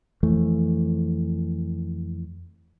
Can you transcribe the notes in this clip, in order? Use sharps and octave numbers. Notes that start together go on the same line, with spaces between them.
F2 E3 A3